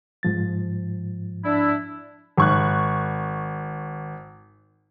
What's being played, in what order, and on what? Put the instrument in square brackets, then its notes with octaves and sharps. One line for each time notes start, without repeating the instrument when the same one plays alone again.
[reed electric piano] G#2 F3 A6
[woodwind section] D4 E4
[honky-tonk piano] G#1 C#6 F#6